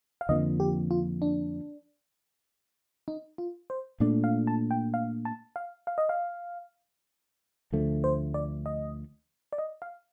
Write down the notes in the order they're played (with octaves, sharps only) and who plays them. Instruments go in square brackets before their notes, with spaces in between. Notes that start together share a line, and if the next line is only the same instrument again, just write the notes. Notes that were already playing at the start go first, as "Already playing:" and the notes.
[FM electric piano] F5
[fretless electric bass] F2 D3 F3 A#3 [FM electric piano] D#5
[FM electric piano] G4
F4
D4
D#4
F4
C5
[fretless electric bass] A#2 A3 D4 [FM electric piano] D5
[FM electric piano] F5
A5
G5
F5
A5
F5
F5
D#5
F5
[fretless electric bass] D2 D3 F3 A3
[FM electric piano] C5
D5
D#5
D5
D#5
F5